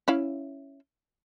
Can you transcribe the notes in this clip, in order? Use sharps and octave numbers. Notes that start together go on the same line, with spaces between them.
C#4 E4 F5